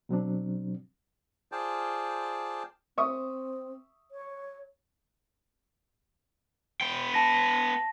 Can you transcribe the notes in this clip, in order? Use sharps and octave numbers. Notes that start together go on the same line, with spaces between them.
B2 F#3 C4 D4
F4 G#4 C5 D5 G5 A5
C4 E5 C#6 D#6
C#5
B3 G5
A5 A#6